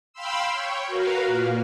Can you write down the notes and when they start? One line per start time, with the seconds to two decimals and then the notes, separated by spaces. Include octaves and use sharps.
0.13 F5 G5 B5 C6 E6
0.51 C#5 G5
0.86 F#4 A#4 B4 F5
1.27 A#2 A#3